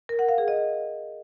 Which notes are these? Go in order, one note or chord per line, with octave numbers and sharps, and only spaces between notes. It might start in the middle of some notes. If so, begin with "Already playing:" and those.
A#4
F#5
F5
G#4
D#5